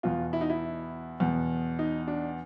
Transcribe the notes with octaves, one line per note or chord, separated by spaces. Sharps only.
E2 B2 F4
E4
D#4
E4
E2 B2
D#4
D4